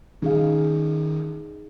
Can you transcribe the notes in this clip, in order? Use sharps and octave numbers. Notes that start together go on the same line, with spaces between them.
D#3 C#4 D#4 G#4 F5